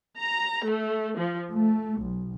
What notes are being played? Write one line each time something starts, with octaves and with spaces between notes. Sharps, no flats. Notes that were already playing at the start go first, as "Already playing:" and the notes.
A#5
A3
F3
A3
B1